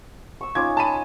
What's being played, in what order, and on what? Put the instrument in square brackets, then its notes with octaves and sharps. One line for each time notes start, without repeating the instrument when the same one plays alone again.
[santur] C#6 E6
[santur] C#4 D#4 F4 [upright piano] D6 G#6
[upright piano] A5 B5 D#7